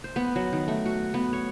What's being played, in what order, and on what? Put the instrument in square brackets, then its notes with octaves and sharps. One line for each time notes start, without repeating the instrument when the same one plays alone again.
[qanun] C5
B3
F#3
D#3
A3
F#4
B3
C#5